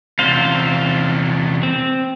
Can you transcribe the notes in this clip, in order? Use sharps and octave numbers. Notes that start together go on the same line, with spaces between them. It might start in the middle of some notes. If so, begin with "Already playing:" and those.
E2 C3 C5 F5
C4